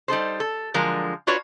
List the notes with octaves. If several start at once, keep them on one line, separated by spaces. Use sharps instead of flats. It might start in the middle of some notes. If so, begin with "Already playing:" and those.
G3 D#4 A4 C5
A4
D3 F3 F#3 G#3 A#4
D4 F4 F#4 B4 C#5 D5